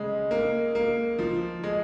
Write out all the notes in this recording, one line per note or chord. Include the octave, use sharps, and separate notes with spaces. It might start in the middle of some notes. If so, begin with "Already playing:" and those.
Already playing: C#3 G#3 D#5
A#3
A#3
F3
G#3